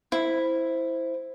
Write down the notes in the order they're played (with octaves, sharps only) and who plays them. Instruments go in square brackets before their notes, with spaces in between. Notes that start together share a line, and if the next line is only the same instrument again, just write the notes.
[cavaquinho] E4 [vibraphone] C5